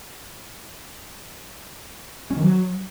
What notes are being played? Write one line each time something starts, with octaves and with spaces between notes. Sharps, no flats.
C#4
D#3
F#3